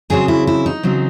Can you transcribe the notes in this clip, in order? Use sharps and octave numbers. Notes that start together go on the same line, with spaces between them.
C#3 F#3 C4 G#4
E4
E4
D#4
C#3 F#3 C4